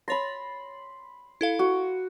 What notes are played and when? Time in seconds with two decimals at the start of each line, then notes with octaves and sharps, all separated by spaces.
0.08 C#5 B5 C6 A6 A#6
1.41 E4 A4 F5
1.59 F#4